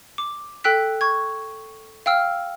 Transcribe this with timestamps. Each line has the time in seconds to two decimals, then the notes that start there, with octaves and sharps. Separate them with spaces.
0.18 D6
0.64 A4 G5 E6 F#6 B6
1.01 C#6 G#6
2.06 F5 G5 E6 F6